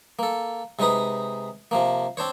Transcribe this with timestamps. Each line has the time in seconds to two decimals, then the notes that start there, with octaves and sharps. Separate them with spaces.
0.19 A#3 A4
0.79 C3 G#3 D#4 B4 D#6
1.71 C3 F3 A#3
2.17 C4 D4 C5 C#5